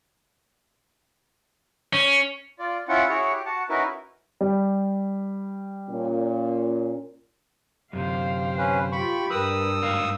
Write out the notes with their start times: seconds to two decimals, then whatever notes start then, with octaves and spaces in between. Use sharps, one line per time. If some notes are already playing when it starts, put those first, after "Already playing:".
1.93 C#4
2.59 F4 D5
2.88 C#4 E4 F4 F#5
3.09 E4 F#4 G#4 C#5 F#5
3.33 G4
3.46 F#4 F#5 A5
3.69 C#4 D#4 E4 F#4 A#4 B4
4.41 G3
5.89 A#2 C#4
7.93 F#2 C3 G4 C5 F5
8.58 C#4 B4
8.92 F4 G4 B5 C#6
9.31 G2 A#4 B4 D#6 E6
9.82 G#2 F#4 F5